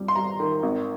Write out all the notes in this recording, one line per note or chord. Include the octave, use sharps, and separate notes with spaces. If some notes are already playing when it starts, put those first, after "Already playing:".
Already playing: F2 G3
C6
G3 A#5
D#3
G#1